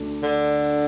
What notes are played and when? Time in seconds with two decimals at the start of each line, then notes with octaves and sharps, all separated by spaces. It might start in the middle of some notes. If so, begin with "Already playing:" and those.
Already playing: D2 A3 D4
0.23 D3